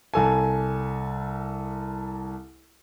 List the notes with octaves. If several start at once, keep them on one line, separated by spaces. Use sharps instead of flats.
C2 A4 G#5